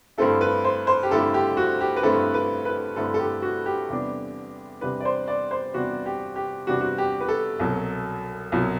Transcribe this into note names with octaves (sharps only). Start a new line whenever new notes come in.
G2 D3 A3 C4 E4 A4
B4
C5
C5
G4
G2 D3 A3 C4 E4 A4
G4
F#4
G4
B4
G2 D3 A3 C4 E4 A4
B4
B4
G2 D3 A3 C4 E4 A4
A4
G4
F#4
G4
E2 C3 G3 B3 D4
E2 C3 G3 B3 D4 B4
D5
C5
D5
C5
E2 C3 G3 B3 D4 F#4
G4
G4
E2 C3 G3 B3 D4 F#4
F#4
G4
B4
A4
C2 B2 F#3
C2 B2 F#3